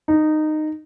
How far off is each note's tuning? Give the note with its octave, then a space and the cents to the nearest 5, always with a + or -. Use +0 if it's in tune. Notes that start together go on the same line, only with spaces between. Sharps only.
D#4 -15